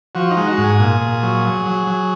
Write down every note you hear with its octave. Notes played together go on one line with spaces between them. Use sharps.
F3 F#4
D#4
G#3
F#4
G#2
G#4
A#2
A#2
F#3
F#3
F#3
F#3